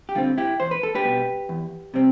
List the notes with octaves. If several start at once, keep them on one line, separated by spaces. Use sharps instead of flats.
G4
D3 G3 C4 F4
E4 G4
E2 C5
B4
A4
G4 B4
B2 G3
E2
C3 G3 C4